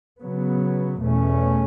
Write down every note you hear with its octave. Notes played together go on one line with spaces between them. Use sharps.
C#3 F#3 B3
E2 B2 A3 C#4